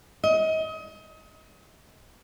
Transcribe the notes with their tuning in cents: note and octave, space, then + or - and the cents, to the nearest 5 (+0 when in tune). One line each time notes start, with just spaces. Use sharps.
D#5 +30